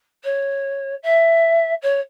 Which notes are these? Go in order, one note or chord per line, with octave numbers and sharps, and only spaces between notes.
C#5
E5
C#5